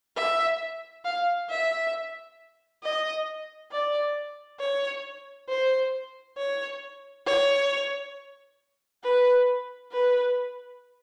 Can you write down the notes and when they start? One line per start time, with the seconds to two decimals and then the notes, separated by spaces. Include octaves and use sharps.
0.16 E5
1.05 F5
1.49 E5
2.83 D#5
3.71 D5
4.60 C#5
5.49 C5
6.38 C#5
7.26 C#5
9.03 B4
9.92 B4